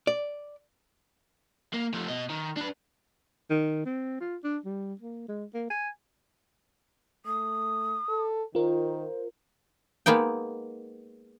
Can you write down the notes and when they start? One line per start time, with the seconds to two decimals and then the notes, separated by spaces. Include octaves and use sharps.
0.07 D5
1.74 A#3
1.94 F3 A3
2.08 B2 D#5
2.30 D#3
2.57 D4 B4
3.51 D#3
3.86 C4
4.21 F4
4.44 D4
4.65 G3
5.01 A#3
5.28 G#3
5.54 A#3
5.70 G#5
7.26 A3 D#6
8.08 A4
8.55 D#3 F4 A#4 C5
10.06 G#3 A#3 B3 D#4 G5